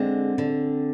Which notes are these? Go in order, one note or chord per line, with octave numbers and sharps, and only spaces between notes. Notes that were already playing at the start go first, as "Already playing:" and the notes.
Already playing: D3 G#3 C4
D3